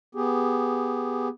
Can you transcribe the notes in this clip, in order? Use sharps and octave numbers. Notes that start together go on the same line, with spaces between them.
B3 G4 G#4